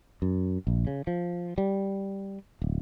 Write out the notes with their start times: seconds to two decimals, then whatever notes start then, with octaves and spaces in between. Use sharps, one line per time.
0.22 F#2
0.67 A#1
0.87 C#3
1.07 F3
1.58 G3
2.62 D1